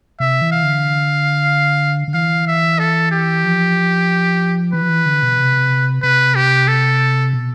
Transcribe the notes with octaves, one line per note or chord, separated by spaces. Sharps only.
C3 E5
E3
F5
D3
D3
E3 F5
E5
A4
G4
F3
E3 B4
F3
E3
D3
B2
C3
C3 B4
G4
A4
B2